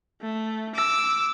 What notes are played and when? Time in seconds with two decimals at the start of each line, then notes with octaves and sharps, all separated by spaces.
0.22 A3
0.75 D6 E6